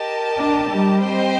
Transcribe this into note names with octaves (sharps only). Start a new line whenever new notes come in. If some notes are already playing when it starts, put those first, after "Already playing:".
Already playing: G4 A#4 D#5 A5
D4
G3
C4 G4 C5 D#5 G5